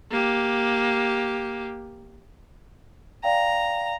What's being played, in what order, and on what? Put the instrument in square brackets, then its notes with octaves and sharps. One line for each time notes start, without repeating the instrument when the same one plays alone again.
[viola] A#3 G4
[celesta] D5 F5 G5 [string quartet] A#5